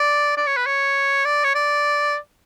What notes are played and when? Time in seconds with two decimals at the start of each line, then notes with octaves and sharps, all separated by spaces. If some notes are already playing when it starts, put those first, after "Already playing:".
Already playing: D5
0.37 D5
0.47 C#5
0.57 B4
0.66 C#5
1.25 D5
1.44 C#5
1.55 D5